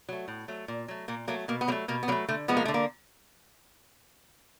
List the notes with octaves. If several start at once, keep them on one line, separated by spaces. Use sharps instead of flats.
F#3 A3
A2
F#3 A3
A#2
F#3 A3
A#2 A#3
F#3 A3 A#3
B2 A#3
B3
F#3 A3 A#3
B2 A#3
B3
F#3 A3 A#3
D3 A3
F3 G#3 B3
A#3
D3 A3
A#3